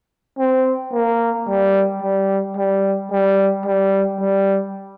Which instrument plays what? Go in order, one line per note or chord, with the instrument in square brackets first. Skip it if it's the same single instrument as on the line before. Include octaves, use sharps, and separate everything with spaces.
[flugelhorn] C4
A#3
G3
G3
G3
G3
G3
G3